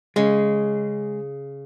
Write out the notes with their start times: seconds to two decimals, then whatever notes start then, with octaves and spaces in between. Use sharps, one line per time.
0.16 C#3 G#3